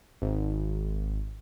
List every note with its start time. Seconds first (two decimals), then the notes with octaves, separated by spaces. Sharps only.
0.22 G#1